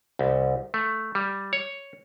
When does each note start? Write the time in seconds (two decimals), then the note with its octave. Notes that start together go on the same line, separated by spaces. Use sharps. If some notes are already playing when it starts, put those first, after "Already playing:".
0.19 C2
0.74 A3
1.15 G3
1.53 C#5